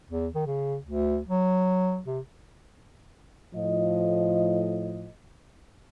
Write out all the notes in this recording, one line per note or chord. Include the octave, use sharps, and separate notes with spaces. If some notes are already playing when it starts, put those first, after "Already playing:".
E2
D#3
C#3
D2
F#3
C3
A2 F3 D#5